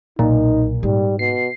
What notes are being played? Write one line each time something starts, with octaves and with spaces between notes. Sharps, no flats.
B1 A#2 D#4
G#2 G3 A#3
B2 C7